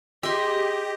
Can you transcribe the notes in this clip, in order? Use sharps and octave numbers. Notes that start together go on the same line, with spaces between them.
G4 G#4 D#5 E5 C6